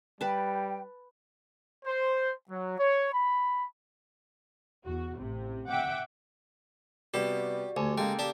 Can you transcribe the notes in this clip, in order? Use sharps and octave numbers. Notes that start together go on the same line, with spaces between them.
G3 B4 G5 A5
C5
F#3
C#5
B5
E2 F#4
A1 C3
E5 F#5 G5 D6
C3 G3 B3 F#4 G4 D5
D2 G4 G#5
C#3 G#3 A#3 A4 G5
G4 D5 A5